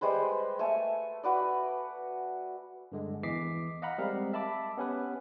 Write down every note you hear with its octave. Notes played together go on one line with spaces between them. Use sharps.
G3 G#3 B4 C5
A3 G#5
F#4 B4 D5
G2 D3 G#3
E2 E3 D#5 D6 B6 C7
D#5 F5 F#5 A#5 B5
G3 G#3 C4 G4 A#4 F5
D#5 E5 A5 B5 D6
B3 C#4 G4 B4